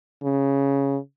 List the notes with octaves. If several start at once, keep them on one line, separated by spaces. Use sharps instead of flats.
C#3